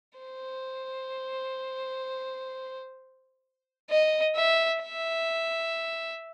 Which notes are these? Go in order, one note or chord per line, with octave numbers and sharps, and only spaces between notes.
C5
D#5
E5
E5